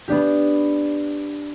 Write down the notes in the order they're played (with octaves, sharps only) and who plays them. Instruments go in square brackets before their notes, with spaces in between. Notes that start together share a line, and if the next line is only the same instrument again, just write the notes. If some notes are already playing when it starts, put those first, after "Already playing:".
[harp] B3 D4 G4